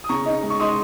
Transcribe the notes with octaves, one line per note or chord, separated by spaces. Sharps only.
D#6
C#3 A#5 C#6
D#4
G#3
C#6
D#4 C6 D#6